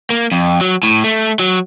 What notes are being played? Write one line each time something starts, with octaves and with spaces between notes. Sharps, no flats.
A#3
F2
F#3
A2
A3
F#3